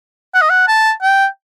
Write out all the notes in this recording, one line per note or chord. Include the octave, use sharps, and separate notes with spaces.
F#5
D#5
F#5
A5
G5